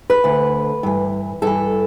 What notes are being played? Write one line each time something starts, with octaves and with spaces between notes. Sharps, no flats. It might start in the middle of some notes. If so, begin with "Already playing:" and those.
B4
D2 D3
G2 E3
G2 E3 A4